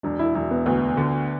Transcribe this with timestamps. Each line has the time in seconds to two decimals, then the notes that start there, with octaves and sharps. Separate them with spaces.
0.03 E1 D4
0.19 E4
0.35 E1 E4
0.51 B3
0.66 D2 B3
0.97 D3